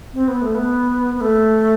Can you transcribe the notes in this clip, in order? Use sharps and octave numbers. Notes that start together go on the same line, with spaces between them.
C4
B3
A3
B3
B3
A3